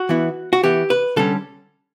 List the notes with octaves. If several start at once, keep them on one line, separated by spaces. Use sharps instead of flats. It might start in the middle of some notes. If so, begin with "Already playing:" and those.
Already playing: F#4
E3 B3 E4
F#4
E3 B3 E4 G4
B4
D3 G3 C#4 A4